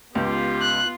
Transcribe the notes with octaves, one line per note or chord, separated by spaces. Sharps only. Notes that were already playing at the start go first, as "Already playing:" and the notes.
C#2 B3 F4 G4
F#6